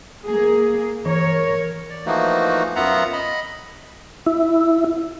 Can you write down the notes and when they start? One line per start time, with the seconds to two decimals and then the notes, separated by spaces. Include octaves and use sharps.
0.25 A#3 G#4
1.05 E3 A#4 C#5
1.90 D5
2.06 E3 F3 A3 A#3 D#4 F#4
2.76 F#2 B3 F4 E5 F#5 A#5
3.13 D#5 B5
4.26 E4